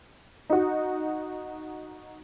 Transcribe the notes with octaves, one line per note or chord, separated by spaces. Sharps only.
D#4 F#4